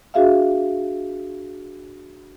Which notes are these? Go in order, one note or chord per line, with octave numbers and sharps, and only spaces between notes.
D4 F#4 G#4 E5 F5